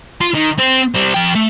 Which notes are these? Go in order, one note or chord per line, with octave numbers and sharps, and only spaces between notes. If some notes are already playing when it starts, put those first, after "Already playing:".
F4
D#3
C4
G3 C4
F3 G5
A3